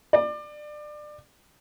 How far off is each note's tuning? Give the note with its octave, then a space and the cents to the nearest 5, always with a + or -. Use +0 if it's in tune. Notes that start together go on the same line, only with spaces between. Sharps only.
D5 +25